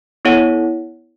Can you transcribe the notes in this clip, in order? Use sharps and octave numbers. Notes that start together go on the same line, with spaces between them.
B3 E4 A4 C#5 F#5